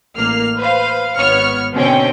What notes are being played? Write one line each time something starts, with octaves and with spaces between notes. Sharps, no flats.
A1 A#3 F6 C7
B4 C5 F5
G#1 B3 C#5 F6 C#7
B2 D3 C4 C#4 G5